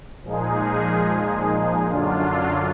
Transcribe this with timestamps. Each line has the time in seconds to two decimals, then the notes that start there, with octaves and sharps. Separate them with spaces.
0.24 A#2 F3 G#3 D#4 G#4
1.87 F#2 D3 F#3 D4 F4